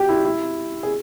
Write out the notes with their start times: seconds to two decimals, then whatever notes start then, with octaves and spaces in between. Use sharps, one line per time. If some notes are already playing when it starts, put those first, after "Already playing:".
Already playing: F#4 G4
0.09 E4
0.25 E4
0.83 G#4